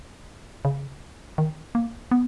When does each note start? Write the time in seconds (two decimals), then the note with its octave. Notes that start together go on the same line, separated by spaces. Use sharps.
0.65 C#3
1.38 D#3
1.75 A#3
2.11 B3